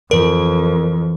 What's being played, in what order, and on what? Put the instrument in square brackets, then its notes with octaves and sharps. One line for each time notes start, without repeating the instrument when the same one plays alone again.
[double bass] F2 [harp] E3 [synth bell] A#4